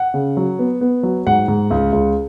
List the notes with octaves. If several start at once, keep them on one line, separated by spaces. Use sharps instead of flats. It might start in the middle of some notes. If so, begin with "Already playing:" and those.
Already playing: F#5
C#3
F#3
B3
B3
F#3
G#2 F#5
G#2
C#2
C#2